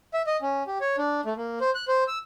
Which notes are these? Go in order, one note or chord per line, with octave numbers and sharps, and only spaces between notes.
E5
D#5
C#4
G4
C#5
D4
A3
A#3
C5
F#6
C5
E6